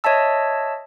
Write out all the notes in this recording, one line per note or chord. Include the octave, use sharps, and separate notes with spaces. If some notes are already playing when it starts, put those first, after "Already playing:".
C#5 D#5 E5 A5 E6